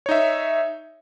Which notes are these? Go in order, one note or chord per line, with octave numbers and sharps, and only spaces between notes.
D#4 C#5 E5